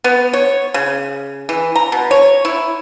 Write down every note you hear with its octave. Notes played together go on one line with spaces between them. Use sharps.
B3
C#5
C#3
E3
A#5
B2
C#5
E4